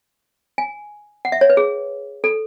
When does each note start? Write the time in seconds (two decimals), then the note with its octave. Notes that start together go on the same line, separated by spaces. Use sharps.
0.58 G#5
1.25 F#5
1.32 E5
1.41 C#5
1.50 B4
1.57 G#4
2.24 A4